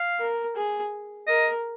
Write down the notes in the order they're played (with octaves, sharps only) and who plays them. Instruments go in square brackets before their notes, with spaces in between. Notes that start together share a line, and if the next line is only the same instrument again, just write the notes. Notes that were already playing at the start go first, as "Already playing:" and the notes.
Already playing: [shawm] F5
[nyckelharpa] A#4
G#4
[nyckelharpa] A#4 [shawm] D#5